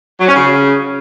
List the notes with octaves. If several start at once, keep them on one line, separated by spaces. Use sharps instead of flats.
F#3
C#4
C#3